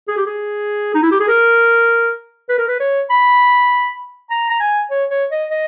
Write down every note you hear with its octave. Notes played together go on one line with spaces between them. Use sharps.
G#4
G4
G#4
D#4
E4
G4
G#4
A#4
B4
A#4
B4
C#5
B5
A#5
A#5
G#5
C#5
C#5
D#5
D#5